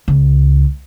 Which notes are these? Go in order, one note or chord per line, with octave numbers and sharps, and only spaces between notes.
C#2